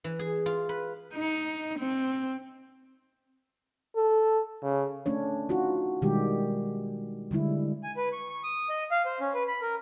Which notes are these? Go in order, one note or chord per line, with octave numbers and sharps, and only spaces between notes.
E3
G#4
F4
B4
D#4
C4
A4
C#3
A3 C#4 D4 C#5
D#4 F4 F#4
B2 D#3 G3 G#3 G4
D3 G3 G#3 E4
G#5
B4
C#6
C#6
D#6
D#5
F5
C5
C#4
B4
B5
A#4